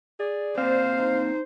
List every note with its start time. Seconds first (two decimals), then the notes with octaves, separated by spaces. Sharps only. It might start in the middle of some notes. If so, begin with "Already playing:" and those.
0.20 G#4 D5
0.58 A#2 C4 C5 F5
0.98 D#4